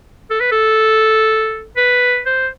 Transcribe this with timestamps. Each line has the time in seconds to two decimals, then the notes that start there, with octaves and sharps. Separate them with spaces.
0.30 A4
0.40 B4
0.52 A4
1.76 B4
2.26 C5